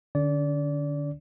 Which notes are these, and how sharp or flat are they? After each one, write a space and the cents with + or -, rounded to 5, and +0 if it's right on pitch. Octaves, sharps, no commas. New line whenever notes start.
D3 +15 C#4 +45 D5 -25